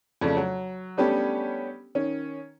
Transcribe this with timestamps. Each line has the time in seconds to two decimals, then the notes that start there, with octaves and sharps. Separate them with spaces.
0.21 F2 C#3 A3 D4
0.37 F#3
0.97 G3 A3 B3 C#4 D4 G4
1.95 D#3 C#4